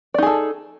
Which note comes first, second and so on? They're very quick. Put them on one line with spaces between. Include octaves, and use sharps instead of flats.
D5 D#4 G#4 A4